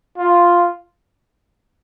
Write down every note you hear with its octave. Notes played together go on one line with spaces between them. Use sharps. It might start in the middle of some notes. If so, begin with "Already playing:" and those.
F4